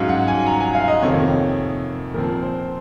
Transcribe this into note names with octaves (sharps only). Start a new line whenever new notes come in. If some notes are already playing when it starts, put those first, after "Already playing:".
Already playing: G#2 F#3 C#4 F5
F#5
G#5
A#5
G#5
F5
D#5
F2 C3 D#3 A#3 C#5
A#2 F3 C4 A#4
C5